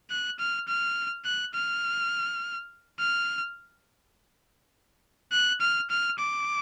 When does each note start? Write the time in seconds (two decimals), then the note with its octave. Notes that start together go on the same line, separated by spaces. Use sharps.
0.10 F#6
0.39 F6
0.68 F6
1.25 F#6
1.54 F6
2.99 F6
5.32 F#6
5.61 F6
5.90 F6
6.19 D6